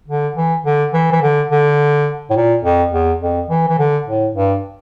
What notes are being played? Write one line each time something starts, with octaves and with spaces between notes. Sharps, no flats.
D3
E3
D3
E3
E3
D3
D3
A2
A#2
F2
E2
F2
E3
E3
D3
A2
G2